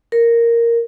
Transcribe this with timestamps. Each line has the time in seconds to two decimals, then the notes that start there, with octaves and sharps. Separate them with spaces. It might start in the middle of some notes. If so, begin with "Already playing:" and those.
0.12 A#4